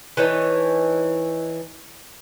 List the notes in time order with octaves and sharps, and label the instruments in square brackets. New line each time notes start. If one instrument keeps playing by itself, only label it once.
[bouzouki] E3 D#4 C#5 A5